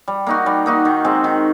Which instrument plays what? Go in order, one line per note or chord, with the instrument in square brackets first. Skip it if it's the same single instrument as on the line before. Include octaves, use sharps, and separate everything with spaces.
[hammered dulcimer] G3
A#3 D#4 F#4
G3
A#3 D#4 F#4
D#3
G#3 C4
D#3